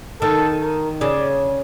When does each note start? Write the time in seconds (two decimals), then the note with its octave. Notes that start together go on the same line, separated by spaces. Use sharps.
0.22 D#3 A4
0.61 A#4
1.01 C#3 D5